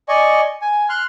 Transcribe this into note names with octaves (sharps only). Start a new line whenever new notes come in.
D5 D#5 G#5 C#6
G#5
C6 F6 F#6